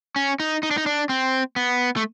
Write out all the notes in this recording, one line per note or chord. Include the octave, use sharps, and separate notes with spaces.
C#4
D#4
D#4
D4
D#4
D4
C4
B3
A3